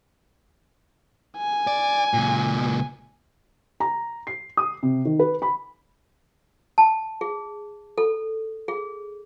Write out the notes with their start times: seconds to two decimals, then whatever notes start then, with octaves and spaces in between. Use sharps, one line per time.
1.37 G#5
1.67 D5
2.13 C#2 A#2
3.80 A#5
4.27 C7
4.57 D#6
4.83 C3
5.05 D#3
5.19 B4
5.42 B5
6.78 A5
7.21 G#4
7.98 A4
8.68 G#4